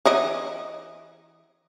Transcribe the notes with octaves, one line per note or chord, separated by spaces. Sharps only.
E3 E4 D#5